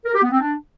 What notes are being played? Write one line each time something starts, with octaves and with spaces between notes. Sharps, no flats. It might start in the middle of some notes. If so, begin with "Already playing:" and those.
A#4
G4
B3
C4
D4